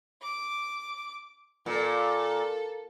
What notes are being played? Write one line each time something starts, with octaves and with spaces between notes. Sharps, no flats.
D6
A#2 A4